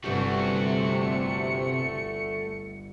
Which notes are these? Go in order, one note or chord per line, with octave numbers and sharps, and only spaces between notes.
G1 C3 A3 F#4 G4 C#7